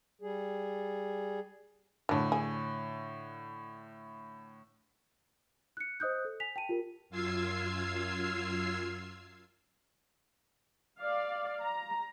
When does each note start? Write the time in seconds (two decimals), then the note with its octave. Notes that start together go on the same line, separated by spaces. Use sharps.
0.21 G3 G#4
2.09 A2 D3 F#3 D4
2.32 G#4
5.77 F#6 C#7
6.00 C5 D#5 D#6 F#6 G6
6.25 A4
6.40 G#5 B6 F7
6.56 G5 A5 D#7
6.69 F4 G4 A#4
7.10 F#2 F4 F5 E6 G#6 C7
10.98 D5 F5
11.61 A#5